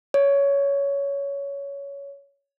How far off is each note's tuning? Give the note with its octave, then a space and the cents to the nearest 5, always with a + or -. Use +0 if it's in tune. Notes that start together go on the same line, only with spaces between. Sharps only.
C#5 +15